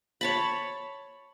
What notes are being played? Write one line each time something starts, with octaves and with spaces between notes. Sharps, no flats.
C#5 A5 B5